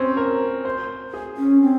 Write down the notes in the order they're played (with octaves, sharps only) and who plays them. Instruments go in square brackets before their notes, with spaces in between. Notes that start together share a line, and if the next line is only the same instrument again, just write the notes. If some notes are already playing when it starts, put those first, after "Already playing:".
Already playing: [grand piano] C4 C#4
A#4
C5
G#4
[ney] C#4
C4